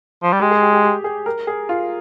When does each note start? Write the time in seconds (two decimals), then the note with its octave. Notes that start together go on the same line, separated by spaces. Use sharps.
0.23 F3
0.32 G3
0.40 G#3 G4
0.51 G#4
0.62 G4
0.73 G4
0.84 G4
1.04 G#4
1.26 A#4
1.47 G#4
1.69 F4